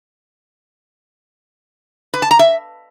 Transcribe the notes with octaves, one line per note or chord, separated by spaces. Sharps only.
B4
A5
A#5
E5